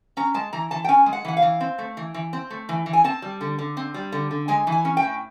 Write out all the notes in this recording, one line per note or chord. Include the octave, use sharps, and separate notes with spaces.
C#4 A#5
G#3 A5
E3 A#5
E3 A5
G5
C#4 G#5
G#3
F#5
E3 F#5
F5
E3
C4
A3
E3
E3
C4
A3
E3
E3
G#5
C4 A5
G3
D3
D3
C4
G3
D3
D3
G#3 G#5
E3
G#5
C#4
G5
A2